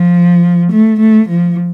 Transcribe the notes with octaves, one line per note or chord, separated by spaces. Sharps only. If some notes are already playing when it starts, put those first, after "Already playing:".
Already playing: F3
A3
A3
F3